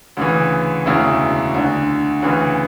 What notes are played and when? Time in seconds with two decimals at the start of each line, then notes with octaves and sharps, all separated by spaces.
0.17 D2 C#3 E3
0.86 E1 D2 C#3 E4
1.54 D2 D3
2.22 D2 C#3 E3